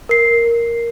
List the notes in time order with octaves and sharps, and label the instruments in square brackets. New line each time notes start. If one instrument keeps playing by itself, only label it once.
[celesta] A#4 C7